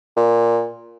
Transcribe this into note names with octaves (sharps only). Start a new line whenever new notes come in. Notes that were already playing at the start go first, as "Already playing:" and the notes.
A#2